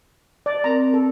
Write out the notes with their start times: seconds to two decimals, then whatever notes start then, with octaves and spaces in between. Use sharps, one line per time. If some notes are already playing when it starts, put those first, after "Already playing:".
0.46 D5
0.64 C4 A#4 A#5
0.94 A4 D5